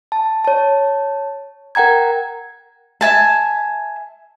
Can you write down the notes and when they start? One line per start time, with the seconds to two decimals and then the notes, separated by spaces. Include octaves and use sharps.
0.12 A5
0.45 C#5 A5
1.75 A#4 F#5 G5 A#5 G#6
3.01 E5 G#5 A5